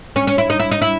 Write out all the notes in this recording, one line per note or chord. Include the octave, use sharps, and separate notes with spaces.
C#4
C#4
E4
D#4
E4
D#4
E4